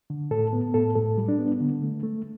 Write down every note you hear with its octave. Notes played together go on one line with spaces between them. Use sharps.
D3
A2 A4
B3
A2 A4
A2 A4
G3
D4
B3
D3
A3
A3